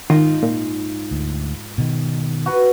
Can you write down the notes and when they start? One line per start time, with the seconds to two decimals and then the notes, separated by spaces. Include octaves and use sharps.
0.10 G#2 D#3 D#4 F4
0.43 A#2
1.11 D2
1.78 B2 D#3
2.46 F#4 B4